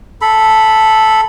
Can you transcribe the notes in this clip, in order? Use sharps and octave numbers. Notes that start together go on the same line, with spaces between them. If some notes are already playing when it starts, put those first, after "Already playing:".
A4 B5